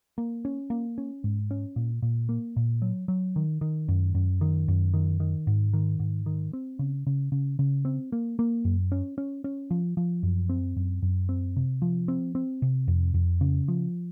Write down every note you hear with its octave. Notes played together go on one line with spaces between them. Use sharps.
A#3
C#4
A#3
C#4
G#2
C#4
A#2
A#2
A#3
A#2
F#3
F#3
D#3
D#3
F#2
F#2
D#3
F#2
D#3
D#3
G#2
D#3
G#2
D#3
C4
C#3
C#3
C#3
C#3
C4
A#3
A#3
F#2
C#4
C#4
C#4
F3
F3
F#2
C4
F#2
F#2
C4
C3
F3
C4
C4
C3
F2
F2
C#3
F3